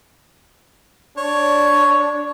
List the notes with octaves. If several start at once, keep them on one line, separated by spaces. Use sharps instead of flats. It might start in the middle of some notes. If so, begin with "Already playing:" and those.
D4 C#5